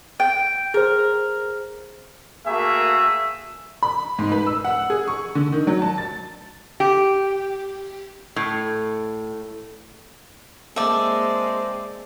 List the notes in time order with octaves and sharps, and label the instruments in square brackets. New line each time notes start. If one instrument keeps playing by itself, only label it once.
[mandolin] G5
[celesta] G#4 C5 [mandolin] A#4
[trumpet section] A3 A#3 F#4 G#4 E5
[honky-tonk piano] B5
G#2
B4
E6
F#5
G#4
C#6
D3
D#3
F#3
A5
A6
[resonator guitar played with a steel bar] G4
A2
[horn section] G#3 C4 [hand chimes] A#3 A5 [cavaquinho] D5 E5